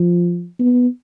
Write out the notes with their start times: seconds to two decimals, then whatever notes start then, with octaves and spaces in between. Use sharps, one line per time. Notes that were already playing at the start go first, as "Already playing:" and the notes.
Already playing: F3
0.59 B3